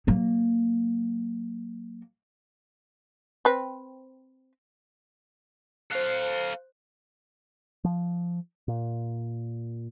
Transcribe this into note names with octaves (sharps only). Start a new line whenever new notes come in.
F#3 A#3
C4 B4
A4 C5 F5 F#6
F3
A#2